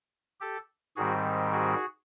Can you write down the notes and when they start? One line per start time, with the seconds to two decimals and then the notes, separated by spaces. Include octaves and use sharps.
0.40 G4 A4
0.96 G#2 D#3 G3 C4 F#4 G#4
1.52 F#4 G#4